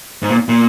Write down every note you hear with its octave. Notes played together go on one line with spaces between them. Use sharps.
G#2
A#2
A#2